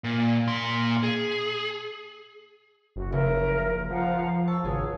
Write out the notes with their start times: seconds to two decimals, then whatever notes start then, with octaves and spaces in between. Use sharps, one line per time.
0.04 A#2
0.47 A#2 C6
1.03 G#4
2.96 F#1 F#4
3.12 F1 C#2 C#3 A#4 E5
3.90 F3 F5 F#5 A#5
4.48 A5 C#6 E6
4.64 G#1 C#2 G#4 C#5 G#5